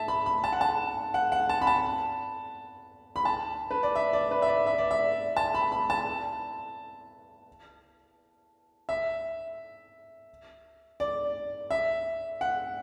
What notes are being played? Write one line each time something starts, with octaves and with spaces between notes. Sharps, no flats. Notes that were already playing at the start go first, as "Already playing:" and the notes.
Already playing: E5 A5
B5
B5
A5
F#5
A5
F#5
F#5
A5
B5
A5
B5
A5
B4
D5
E5
D5
B4
E5
D5
E5
D5
E5
A5
B5
B5
A5
E5
D5
E5
F#5